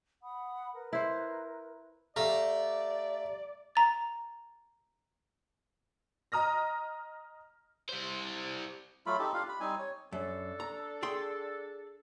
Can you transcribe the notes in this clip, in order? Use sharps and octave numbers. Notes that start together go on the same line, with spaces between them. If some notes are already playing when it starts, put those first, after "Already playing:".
F#5 B5 D#6
A#4 B4
E4 C5
A3 G4 D5 F5 A#5
A#5 A6
D#5 A#5 D#6 F6 A#6
G3 C5
F#3 A3 F4 B5
C4 D#4 G4 A4
D4 F4 G4 F5
B5
G3 C4 D#4 G#5
C#5
F#2 D4 A4
A#5
G#4 G5 C6